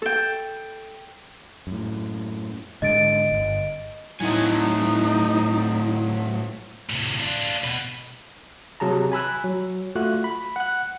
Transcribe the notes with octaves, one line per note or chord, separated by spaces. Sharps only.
A4 G5
F#2 A2
G#2 D3 G#3 D#5 A6 D7
G1
A2 F#3 A3 D#4 E4 G#5
A2 C3
D4 F4
B2 B4
C3 F#3 G#4 A5 A#5
G#5 B5 E6 F#6
F#3
A3 F4 F#4 F#6
B5
F#5 F#6